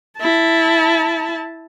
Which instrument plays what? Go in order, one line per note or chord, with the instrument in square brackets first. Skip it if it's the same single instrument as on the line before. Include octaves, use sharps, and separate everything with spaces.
[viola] E4 A5